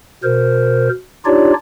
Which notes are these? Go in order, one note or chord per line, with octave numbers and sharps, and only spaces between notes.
B2 A#4 C5
D4 D#4 F4 G4 C#5 D5